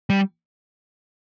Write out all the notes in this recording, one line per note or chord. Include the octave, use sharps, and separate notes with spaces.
G3